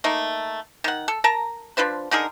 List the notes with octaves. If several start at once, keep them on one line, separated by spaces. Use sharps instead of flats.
A3 A#3 D#4
D#3 F#5
A4
A#4 A5 A#5
F3 D4 B4 C5
D3 D#4 G#4 A#4